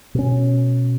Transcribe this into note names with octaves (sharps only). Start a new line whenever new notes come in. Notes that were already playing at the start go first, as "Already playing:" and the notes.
B2 C#4